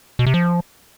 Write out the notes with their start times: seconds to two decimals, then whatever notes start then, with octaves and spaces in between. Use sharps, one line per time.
0.19 B2
0.26 C3
0.34 F3